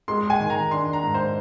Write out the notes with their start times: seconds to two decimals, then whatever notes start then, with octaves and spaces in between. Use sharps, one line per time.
0.08 G#3 C6
0.30 G#5
0.40 D#3
0.50 A#5
0.71 D4 C6
0.93 A#5
1.03 G#2
1.14 C5